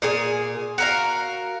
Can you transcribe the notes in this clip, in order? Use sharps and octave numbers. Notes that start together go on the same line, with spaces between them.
A#2 G#4 G#5
F#4 A#4 F5